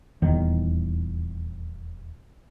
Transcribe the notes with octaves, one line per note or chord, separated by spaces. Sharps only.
D#1 E2 D#3